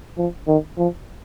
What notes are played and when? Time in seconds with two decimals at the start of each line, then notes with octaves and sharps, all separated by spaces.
0.18 F3
0.48 D#3
0.78 F3